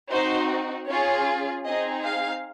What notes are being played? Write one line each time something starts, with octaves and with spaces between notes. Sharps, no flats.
C4 D#4 F#4 C5
C#4 F4 G#4 C#5
C4 D#4 G#4 D#5
F5